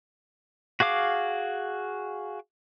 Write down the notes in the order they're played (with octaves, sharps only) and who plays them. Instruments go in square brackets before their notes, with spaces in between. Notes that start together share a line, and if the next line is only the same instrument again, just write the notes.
[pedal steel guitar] F#4 G#4 F5 D6